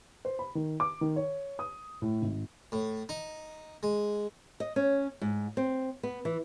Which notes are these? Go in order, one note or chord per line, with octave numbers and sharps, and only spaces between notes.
C5
B5
D#3
D6
D#3
C#5
D#6
A2
G#1
A2
D#4
G#3
D#5
C#4
G#2
C4
B3
E3